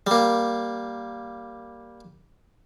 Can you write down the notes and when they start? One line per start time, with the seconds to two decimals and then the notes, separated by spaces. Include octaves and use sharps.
0.07 G3 A#3